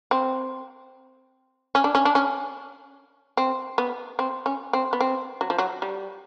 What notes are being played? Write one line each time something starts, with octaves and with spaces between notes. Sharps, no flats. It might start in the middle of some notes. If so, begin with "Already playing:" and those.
C4
C#4
D4
C#4
D4
C#4
C4
B3
C4
C#4
C4
B3
C4
F#3
F3
F#3
G3